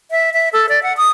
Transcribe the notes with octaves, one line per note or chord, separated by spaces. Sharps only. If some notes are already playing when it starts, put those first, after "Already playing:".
E5
E5
A4
D5
F#5
D#6